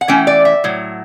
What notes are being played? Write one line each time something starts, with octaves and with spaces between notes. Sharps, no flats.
F#5
E3 A3 C#4 G5
D5
E5
A2 F#3